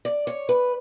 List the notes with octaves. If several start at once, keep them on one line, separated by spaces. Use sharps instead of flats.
D5
C#5
B4